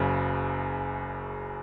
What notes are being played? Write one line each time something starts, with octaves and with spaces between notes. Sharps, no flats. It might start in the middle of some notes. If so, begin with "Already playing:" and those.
Already playing: F#1 F#2 C#3